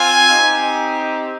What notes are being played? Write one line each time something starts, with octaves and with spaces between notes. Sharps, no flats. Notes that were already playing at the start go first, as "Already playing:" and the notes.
Already playing: C4 F4 G#5
C4 D#4 G4